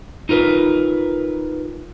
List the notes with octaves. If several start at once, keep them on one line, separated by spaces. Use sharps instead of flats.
D#4 F4 A#4 B4